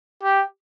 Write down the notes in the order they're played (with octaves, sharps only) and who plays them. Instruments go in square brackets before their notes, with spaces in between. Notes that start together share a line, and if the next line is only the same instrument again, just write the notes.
[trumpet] G4